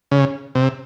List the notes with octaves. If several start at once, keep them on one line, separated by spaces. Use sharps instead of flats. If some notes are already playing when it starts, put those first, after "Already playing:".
C#3
C3